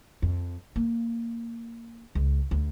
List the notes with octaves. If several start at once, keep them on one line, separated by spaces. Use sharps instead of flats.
F2
A#3
C#2
D2